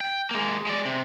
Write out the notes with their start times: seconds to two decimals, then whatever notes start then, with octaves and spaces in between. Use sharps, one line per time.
0.01 G5
0.31 G#3 A#3
0.67 G#3 D5
0.85 C3